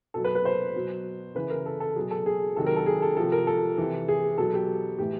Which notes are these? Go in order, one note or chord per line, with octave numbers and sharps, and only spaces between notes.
B2 F#3 A4
B4
B4
C5
B2 F#3
C#3 E3 B4
A#4
A4
A4
B2 F#3 G#4
A4
G#4
C3 D#3 F#3 A4
A#4
A4
G#4
A4
C3 F3 A4
A#4
A4
C3 E3
G#4
B2 F#3 A4
G4
A2 E3 G4